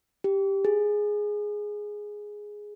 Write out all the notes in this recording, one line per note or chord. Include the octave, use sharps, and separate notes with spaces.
G4
G#4